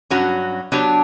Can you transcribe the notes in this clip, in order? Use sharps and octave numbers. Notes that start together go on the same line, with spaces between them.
G2 F#3 C#4 F#4 C#5
F#3 B3 D4 G4 C#5